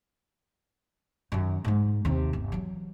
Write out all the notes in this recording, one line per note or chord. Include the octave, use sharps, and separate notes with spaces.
F#2 D#3
G#2 G#3
D#2 C3
G1
E3 F#3